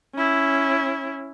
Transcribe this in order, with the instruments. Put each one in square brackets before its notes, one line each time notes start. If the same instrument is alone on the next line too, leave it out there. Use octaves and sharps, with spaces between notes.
[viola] C#4 E4